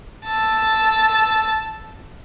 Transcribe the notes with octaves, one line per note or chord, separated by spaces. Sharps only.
A5 E6